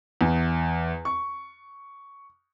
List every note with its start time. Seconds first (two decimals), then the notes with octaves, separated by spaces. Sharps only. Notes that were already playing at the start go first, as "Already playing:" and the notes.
0.21 E2
1.05 C#6